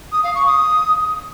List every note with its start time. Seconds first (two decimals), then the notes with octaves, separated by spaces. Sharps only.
0.12 D#6
0.23 F5
0.35 C#6
0.46 D#6